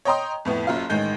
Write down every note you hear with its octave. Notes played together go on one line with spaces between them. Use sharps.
C#5 D#5 G5 A#5 C6 D#6
F2 A2 B3
F#1 F#2 F4 F5
A1 D#3 G#3 G6